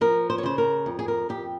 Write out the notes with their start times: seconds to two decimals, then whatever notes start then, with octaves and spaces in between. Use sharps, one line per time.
0.01 F3 A#4
0.30 C5
0.38 C#5
0.43 C#3 C5
0.58 A#4
0.86 F2
0.99 G#4
1.08 A#4
1.29 F2 G4